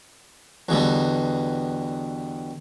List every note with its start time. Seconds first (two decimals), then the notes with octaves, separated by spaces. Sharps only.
0.69 E2 B2 D3 G3